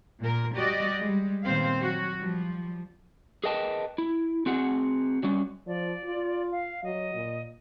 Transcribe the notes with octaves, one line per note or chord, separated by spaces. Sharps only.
A#2 A#4
G3 F#4 G4 D5 D#5
G3 G#3
D#2 A#2 B3 C4 C5 F5
F#3 F#4
F3 G3
G#4 A#4 B4 D#5 G5 A5
E4
C4 F#4 G#4 F#5
F#3 G3 C#4
F3 D5
F4
F5
F#3 D#5
A#2